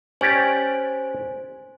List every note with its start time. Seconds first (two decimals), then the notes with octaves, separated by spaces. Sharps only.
0.21 C#4 G4 C5 D5 G#5